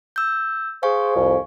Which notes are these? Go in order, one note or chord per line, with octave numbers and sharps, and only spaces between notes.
E6 G6
G#4 C5 F5 G#5 C#6
C2 F2